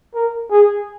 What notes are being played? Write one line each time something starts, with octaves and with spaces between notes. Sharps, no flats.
A#4
G#4